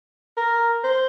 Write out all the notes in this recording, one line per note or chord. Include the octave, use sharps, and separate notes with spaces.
A#4
C5